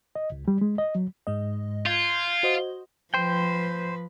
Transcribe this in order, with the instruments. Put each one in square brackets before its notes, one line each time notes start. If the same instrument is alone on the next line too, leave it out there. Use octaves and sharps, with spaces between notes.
[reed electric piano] D#5
C#2
G3
G#3
D#5
F#3
[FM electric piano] G#2 G#3 D#5
[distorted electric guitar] F4 [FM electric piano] G6 G#6
[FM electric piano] F#4 C5 D#5
[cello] F3 B4 [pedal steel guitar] C5 G5